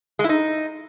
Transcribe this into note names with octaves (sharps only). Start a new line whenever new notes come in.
G#3
E4
D#4